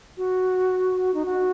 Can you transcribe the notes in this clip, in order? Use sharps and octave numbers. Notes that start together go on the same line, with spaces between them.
F#4
D#4
F#4